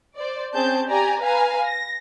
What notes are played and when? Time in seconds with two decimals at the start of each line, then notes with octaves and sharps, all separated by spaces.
0.17 C5 D5
0.53 C4 C#4 G#4 A5 G6
0.87 G4 D5 G#5 A#5
1.20 B4 F5 G#5 A#5
1.65 A#6